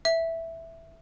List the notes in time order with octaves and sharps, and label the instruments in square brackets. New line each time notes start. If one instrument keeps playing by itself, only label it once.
[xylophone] E5